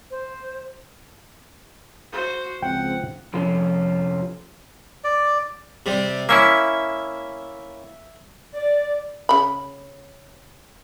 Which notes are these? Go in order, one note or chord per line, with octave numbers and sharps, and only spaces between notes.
C5
F#4 C5
C#2 F3 C4 F#5 G5
F2 C3 F3 C#4 F4
D5
C3 G3
A#3 C#4 E4 E5
D5
C#3 B5